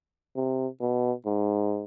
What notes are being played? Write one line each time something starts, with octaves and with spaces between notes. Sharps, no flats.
C3
B2
G#2